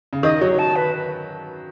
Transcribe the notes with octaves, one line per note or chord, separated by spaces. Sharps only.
C#3
D#3 D#5
F#3 C#5
A5
B4